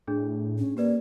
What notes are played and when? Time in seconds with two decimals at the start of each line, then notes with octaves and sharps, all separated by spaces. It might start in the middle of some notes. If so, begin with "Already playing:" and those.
0.07 A2 D4 G#4
0.59 C#4
0.77 A#3 G4 B4 D5